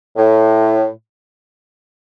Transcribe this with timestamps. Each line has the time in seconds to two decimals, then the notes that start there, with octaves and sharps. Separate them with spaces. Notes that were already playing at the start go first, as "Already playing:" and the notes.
0.16 A2